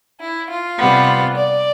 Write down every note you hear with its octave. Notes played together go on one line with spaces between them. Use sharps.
E4
F4
C3 G3 B3
D5